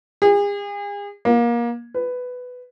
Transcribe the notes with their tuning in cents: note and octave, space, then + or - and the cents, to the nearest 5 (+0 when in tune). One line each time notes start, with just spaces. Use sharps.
G#4 -40
A#3 +25
B4 +10